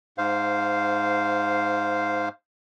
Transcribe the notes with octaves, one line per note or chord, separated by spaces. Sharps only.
G#2 C5 F5